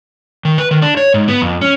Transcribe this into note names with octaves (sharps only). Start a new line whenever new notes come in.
D#3
B4
D#3
D4
C#5
G#2
B3
F2
C#4